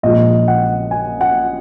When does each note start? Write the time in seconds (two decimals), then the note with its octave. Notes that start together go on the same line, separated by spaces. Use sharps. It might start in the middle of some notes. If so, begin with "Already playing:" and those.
0.03 A#1 A#2 G#3 D#5
0.48 F#5
0.91 G#5
1.21 F#5